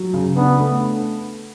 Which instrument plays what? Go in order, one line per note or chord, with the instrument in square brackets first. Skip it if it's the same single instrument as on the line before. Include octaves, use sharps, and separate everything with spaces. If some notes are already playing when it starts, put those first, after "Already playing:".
Already playing: [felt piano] F#3
C#3
[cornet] B3 [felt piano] D4
[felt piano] A3